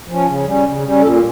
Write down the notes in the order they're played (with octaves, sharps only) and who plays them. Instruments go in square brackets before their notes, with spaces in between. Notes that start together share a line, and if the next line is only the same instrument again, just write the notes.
[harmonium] F3 C#4
C#3
G3 C#4
C#3
G3 C#4
A#2 A4